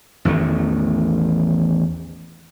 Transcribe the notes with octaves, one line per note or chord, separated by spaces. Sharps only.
A1 E2 D#3 A3